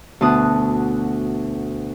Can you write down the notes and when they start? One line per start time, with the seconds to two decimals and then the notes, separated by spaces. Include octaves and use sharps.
0.21 D2 B2 A5 D#6 F#6